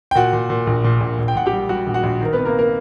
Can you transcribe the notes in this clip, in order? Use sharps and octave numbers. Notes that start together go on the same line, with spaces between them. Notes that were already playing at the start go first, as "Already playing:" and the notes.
G5
A#2 F#4 F#5
A#2
A#2
A#1
A#2
A#1
A#1
G5
A#1 F#5
G4 G5
G3
G3 F#4 F#5
A#1
F#4 F#5
A#1
D#3 A#4
C3 B3 B4
A#3 A#4
A#3 A#4